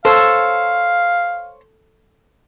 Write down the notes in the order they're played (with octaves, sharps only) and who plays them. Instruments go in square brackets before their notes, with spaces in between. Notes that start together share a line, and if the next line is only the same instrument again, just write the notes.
[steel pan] A4 [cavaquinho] C5 C#5 [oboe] F5